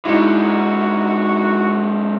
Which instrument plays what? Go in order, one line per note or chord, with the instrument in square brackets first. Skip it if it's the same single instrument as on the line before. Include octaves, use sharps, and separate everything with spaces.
[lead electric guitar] D3 G#3 [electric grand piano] D#4 E4 [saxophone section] F#4